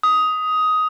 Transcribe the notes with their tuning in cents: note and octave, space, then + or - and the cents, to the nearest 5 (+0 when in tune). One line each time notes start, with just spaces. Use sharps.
D#6 +10